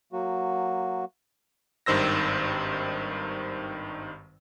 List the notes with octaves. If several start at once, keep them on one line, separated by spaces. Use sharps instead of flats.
F#3 A#3 F#4
G#1 G2 D#3 C5 E6 A#6